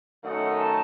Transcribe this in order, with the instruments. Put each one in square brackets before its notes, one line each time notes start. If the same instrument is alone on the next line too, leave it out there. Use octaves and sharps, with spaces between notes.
[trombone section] F#2 D#3 A3 D#4 [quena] F#5
[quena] A5